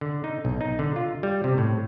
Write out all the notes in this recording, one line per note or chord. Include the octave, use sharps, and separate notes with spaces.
D3
D#4
B1
D#4
D3
F4
G3
C3
A2